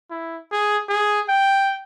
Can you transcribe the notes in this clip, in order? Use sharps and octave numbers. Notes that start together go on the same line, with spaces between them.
E4
G#4
G#4
G5